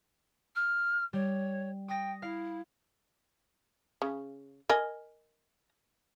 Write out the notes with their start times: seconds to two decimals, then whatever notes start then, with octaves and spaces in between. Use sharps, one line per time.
0.55 F6
1.13 G3 C#5
1.88 G5 D#6 A#6
2.22 E4 F5
4.02 C#3
4.70 A#4 D#5 G#5